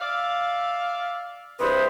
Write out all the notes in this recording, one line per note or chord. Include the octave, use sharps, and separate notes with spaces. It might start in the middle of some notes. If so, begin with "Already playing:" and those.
D5 E5 F5
E2 G2 C3 B4 C5 C6 D#6